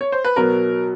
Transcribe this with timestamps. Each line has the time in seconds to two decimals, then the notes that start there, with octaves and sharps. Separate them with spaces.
0.01 C#5
0.12 C5
0.25 B4
0.36 B2 F#3 B3 A#4